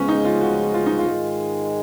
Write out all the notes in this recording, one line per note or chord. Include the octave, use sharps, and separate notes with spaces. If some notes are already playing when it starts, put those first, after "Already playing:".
Already playing: C#2 C#3 F3 G#3 B3 C#4
D#4
F4
F#4
F4
D#4
F4
G#2 D#3 G#3